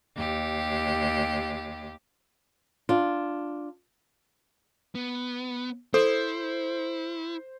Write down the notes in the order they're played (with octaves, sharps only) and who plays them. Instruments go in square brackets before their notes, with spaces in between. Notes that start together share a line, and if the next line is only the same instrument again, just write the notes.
[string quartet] D#2 G4
[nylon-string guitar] D4 F4
[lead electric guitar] B3
[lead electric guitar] E4 [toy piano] A4 [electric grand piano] C5